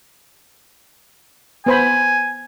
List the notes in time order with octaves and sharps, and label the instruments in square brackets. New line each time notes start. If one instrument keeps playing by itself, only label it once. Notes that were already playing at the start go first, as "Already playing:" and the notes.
[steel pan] B3 C5 B5 [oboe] G#5